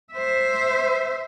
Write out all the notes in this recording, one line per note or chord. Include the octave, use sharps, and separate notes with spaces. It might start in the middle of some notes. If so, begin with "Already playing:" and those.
C5 E5